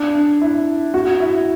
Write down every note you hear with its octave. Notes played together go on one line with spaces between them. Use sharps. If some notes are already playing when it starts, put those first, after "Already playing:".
Already playing: D4
E4
F#4
E4